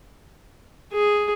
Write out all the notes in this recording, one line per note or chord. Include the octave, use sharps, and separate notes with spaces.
G#4